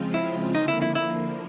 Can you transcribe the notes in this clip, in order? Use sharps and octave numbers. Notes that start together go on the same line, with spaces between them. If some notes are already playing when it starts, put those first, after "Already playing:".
Already playing: C#3 F3 G#3 C4 F4
E4
D3 F3 A#3 D#4
E4
E4
E4